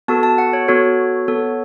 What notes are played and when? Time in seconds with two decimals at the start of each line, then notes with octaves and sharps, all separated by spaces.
0.08 B3 F#4 A4 A5
0.23 A5
0.38 F#5
0.53 C#5
0.68 B3 F#4 A4 C#5
1.28 B3 A4